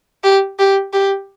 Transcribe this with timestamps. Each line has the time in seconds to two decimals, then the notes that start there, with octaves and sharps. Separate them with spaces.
0.24 G4
0.59 G4
0.93 G4